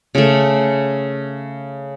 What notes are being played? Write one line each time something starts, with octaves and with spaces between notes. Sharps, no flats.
C#3 A3